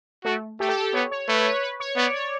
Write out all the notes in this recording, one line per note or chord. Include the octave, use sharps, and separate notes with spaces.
A3 F#4
A3 G4
A4
G4
A4
B3 C#5
C#5
A3 B4
C#5
B4
C#5
B3 D5
C#5